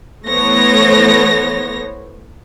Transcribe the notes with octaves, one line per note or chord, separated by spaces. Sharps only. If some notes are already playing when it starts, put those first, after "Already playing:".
E3 A3 B3 C5 C#5 A#6